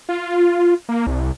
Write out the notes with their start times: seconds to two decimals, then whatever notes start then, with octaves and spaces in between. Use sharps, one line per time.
0.09 F4
0.89 A#3
1.07 C2